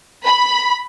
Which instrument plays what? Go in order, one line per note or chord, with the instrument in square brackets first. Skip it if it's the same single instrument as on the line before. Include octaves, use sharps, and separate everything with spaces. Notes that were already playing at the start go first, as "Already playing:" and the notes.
[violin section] B5